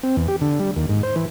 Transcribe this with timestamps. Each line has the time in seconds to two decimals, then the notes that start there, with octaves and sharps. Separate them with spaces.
0.03 C4
0.17 E2
0.28 G4
0.41 D3
0.59 G3
0.76 D#2
0.89 G#2
1.03 C5
1.16 E3